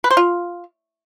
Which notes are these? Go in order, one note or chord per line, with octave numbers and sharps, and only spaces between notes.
B4
C5
F4